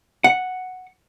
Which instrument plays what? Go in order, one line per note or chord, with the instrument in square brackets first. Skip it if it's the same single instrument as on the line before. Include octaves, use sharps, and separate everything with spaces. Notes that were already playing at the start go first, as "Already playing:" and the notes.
[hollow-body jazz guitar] F#5